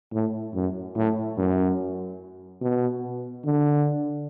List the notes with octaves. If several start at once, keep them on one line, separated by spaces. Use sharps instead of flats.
A2
F#2
A2
F#2
B2
D3